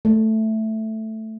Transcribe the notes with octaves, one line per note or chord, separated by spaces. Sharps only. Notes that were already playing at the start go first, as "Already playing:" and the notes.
A3